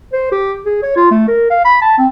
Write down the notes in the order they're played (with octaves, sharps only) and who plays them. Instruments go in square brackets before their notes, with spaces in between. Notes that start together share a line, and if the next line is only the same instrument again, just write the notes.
[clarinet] C5
G4
G#4
C#5
F4
A3
A#4
F5
B5
A5
C4